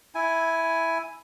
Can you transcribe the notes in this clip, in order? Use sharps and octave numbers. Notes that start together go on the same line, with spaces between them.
E4 G#5